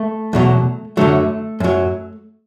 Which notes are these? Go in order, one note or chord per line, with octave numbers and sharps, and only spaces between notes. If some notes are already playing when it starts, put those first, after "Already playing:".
Already playing: A3
E2 B2 F#3
F#2 D3 F#3 A3
F#2 F#3